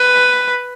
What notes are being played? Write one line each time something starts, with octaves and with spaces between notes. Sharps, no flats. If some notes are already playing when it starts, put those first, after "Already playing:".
Already playing: B4